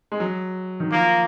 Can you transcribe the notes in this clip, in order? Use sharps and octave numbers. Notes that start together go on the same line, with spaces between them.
G#3
F#3
D#3
F3 A#3